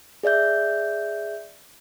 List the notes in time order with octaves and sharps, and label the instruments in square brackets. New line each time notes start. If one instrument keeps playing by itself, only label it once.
[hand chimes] G#4 D5 E5 G6